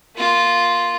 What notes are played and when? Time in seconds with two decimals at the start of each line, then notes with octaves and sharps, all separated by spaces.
0.16 A#3 F4